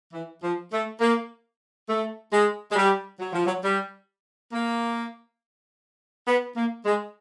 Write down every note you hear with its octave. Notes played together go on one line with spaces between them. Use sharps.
E3
F3
A3
A#3
A3
G#3
G#3
G3
F#3
F3
F#3
G3
A#3
B3
A#3
G#3